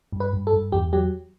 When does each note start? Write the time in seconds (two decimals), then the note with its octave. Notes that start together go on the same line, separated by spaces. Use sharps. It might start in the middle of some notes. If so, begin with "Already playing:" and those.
0.12 G2
0.20 B4
0.33 G2
0.47 A4
0.53 G2
0.72 E2 G4
0.93 F#3 G4